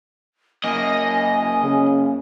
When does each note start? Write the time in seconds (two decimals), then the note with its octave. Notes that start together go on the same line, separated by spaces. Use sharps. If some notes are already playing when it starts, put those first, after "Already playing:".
0.64 F#2 A#3 D#5 G#5
1.62 C#3